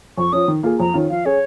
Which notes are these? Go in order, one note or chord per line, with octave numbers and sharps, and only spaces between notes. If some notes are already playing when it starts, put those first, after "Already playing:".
F2 C#6
F3 C#4 D#6
D#3
A#3 F4 G#4
F2 A#5
D#3 C#4 F4
F3 F5
C#4 G#4 C#5